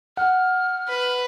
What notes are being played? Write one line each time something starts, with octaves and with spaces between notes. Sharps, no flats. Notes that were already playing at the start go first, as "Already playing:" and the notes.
F#5 F6
B4